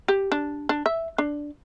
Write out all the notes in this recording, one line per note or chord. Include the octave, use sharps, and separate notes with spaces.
G4
D4
D4
E5
D4